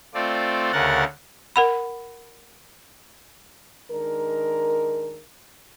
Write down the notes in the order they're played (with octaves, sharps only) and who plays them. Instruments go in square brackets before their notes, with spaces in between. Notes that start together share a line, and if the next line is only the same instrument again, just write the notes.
[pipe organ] A3 C4 F4 D5
D2 C#3 A#4 F#5 A6
[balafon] A#4 F#5 B5
[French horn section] D#3 G#3 D4 A#4